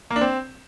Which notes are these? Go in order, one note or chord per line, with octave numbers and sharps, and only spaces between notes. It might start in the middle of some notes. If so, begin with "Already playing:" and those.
A#3
D4
C4